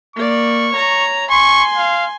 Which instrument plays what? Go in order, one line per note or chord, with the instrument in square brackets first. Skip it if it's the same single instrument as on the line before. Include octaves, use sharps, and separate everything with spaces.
[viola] A#3 D5 [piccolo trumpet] C#6
[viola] C#5 A#5
[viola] G#5 C6 [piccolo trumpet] C#6
[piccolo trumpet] F5